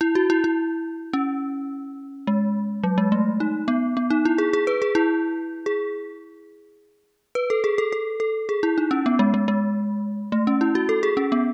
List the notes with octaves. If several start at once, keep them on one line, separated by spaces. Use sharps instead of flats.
E4
F#4
E4
E4
C#4
G#3
F#3
G#3
A3
D#4
B3
B3
D#4
E4
G#4
G#4
B4
G#4
E4
G#4
B4
A4
G#4
A4
A4
A4
G#4
E4
D#4
C#4
B3
G#3
G#3
G#3
A3
C#4
E4
F#4
A4
G#4
C#4
B3